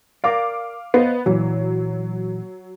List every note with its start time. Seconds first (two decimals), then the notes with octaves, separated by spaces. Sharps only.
0.24 A#4 D5 F5 D6
0.94 B3 C5 D#5 F5
1.26 A#2 E3 F#3